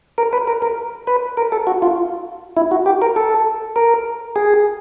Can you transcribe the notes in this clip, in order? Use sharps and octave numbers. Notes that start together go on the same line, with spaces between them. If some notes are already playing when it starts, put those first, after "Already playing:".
A#4
B4
A#4
A#4
B4
A#4
A4
F#4
F4
E4
F#4
G4
A#4
A4
A#4
G#4